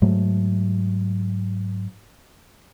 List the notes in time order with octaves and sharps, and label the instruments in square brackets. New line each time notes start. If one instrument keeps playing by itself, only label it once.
[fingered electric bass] G#2 F#3 A3